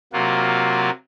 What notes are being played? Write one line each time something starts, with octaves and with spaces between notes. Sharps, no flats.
C3 F#3 A#3 F4 F#4